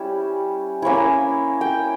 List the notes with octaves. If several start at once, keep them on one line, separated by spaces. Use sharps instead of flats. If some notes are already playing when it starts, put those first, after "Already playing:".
Already playing: G3 C#4 E4 E5
A#3 C#4 E4
G5